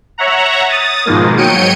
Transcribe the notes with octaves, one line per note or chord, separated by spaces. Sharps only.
C#5 E5 F#5 A#5
D#6 A6
G#2 B2 D#3 F3 G#3 A#3
G#2 F#3 C#5 G5 C#7 D#7